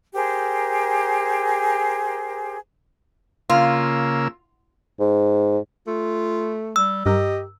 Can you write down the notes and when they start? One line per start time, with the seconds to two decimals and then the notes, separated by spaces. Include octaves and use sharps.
0.14 G4 G#4 A#4 C5
3.50 C#3 A#3 F4 E6
5.00 G#2
5.87 A3 F4
6.76 G3 E6
7.06 G2 G4 A#4 D#5